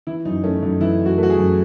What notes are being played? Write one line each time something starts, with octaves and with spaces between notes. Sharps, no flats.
E3 E4
F#2 D#4
A3 C#4
F#2 D#4
E3 E4
F#2
F#4
A3 F#4
G#4
F#2